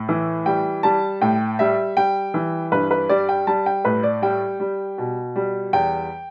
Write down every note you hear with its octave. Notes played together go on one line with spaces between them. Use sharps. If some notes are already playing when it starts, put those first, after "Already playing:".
Already playing: A2
E3
G3 G5
G3 A5
A2 G5
G3 E5
G3 G5
E3
G2 B4
B4
G3 D5
G5
G3 A5
G5
A2 B4
D5
G3 G5
G3
B2
G3
E2 G5